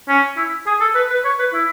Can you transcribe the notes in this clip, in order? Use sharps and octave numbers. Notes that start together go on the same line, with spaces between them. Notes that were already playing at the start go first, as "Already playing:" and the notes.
C#4
E4
G#4
A4
B4
B4
C#5
B4
E4